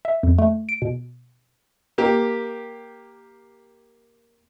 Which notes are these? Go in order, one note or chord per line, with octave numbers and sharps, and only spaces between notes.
E5
F2
A3
D7
B2
A#3 G4